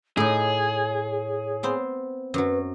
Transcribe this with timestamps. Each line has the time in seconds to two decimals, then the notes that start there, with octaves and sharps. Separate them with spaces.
0.17 A2 D#4 G#4 C#5
1.63 B3 C4 C5
2.34 F#2 F#3 B4